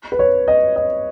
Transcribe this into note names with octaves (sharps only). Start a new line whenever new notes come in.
B4
C#5
D#5
D#5